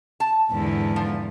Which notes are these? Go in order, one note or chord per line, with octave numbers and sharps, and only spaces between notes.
A5
E2 G#2 D3
F3